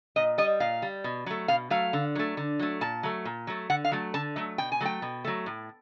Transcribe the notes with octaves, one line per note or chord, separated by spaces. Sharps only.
A#2 D#5
G3 D#5
A#2 F5
G3
B2
F#3 A3
B2 F5
F#3 A3 F5
D3
F#3 A3
D3
F#3 A3
A#2 A5
F#3 A3
A#2
F#3 A3
D3 F#5
F5
F#3 A3
D3 A5
F#3 A3
B2 G5
G#5
F#3 A3 G5
B2
F#3 A3
A2